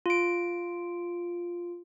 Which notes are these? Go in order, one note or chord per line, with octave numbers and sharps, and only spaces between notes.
F4 D7